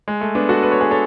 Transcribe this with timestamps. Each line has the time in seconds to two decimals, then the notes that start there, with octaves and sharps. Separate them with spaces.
0.08 G#3
0.21 A3
0.35 B3 D4
0.49 F#4 A4
0.63 B4
0.72 C#5
0.81 G#4 B4
0.91 A4 C#5